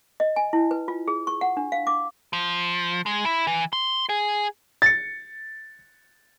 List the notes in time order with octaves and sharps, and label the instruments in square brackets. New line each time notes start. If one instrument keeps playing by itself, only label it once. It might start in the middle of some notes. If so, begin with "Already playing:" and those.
[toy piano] D#5
G#5
E4
B4
F4
G#4
C#6
F#5
D4
F5
D6
[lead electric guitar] F3
G#3
E4
E3
C6
G#4
[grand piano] A6 C#7